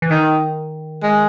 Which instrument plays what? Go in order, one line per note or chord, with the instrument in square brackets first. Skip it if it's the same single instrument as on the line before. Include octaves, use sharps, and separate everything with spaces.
[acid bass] E3
[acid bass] D#3 [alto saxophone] D#4
[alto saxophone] G#3